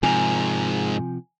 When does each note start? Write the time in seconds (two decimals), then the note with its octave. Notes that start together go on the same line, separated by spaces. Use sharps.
0.03 G#2 C3 F3 A#4 G#5